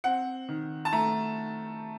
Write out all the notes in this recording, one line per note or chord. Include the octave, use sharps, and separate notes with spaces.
C4 F#5
D#3
A5
A3 A#5